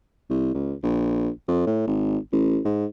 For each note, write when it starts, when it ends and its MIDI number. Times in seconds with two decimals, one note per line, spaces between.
0.30 0.52 36
0.55 0.74 37
0.83 1.29 34
1.48 1.64 41
1.67 1.83 45
1.87 2.18 32
2.33 2.60 33
2.65 2.86 44